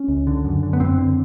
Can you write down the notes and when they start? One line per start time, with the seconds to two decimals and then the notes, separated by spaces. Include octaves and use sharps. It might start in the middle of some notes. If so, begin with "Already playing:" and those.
Already playing: C#4
0.08 C#2
0.27 D3
0.45 F#2
0.63 D3
0.73 B3
0.80 F#2 C4
0.98 D3